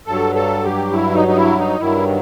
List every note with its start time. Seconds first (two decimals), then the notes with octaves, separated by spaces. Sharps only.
0.07 G2 F#3 A4
0.35 A4
0.64 G4
0.93 E4
1.15 D#4
1.28 D#4
1.36 E4
1.58 D#4
1.80 G2 D#3 F#3 E4